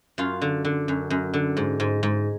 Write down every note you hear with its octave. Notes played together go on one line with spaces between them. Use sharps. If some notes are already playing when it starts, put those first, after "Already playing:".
F#2 F4
D3
D3
F#2
F#2
D3
G#2
G#2
G#2